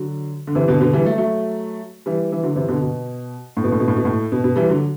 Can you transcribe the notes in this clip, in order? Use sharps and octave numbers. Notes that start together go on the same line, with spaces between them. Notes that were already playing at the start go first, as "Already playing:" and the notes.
Already playing: D3 F#3
D3
C3 E3
B2 D3
B2 D3
E3 G3
F#3 A3
F#3 A3
E3 G3
E3
D3 F#3
C3 E3
B2 D3
B2
A2
B2
A2
B2
A2
B2
A2
B2
B2
E3 G3
D3 F#3